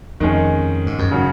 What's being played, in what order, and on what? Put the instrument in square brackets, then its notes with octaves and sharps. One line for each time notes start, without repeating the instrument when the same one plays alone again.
[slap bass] F2 [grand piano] D#3 G#3 C#4
[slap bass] G#2
F#2
[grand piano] C#3 F#3 C#4